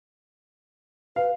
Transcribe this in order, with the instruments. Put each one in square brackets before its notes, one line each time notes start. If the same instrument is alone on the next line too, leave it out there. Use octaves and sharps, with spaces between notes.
[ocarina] B4 [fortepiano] F5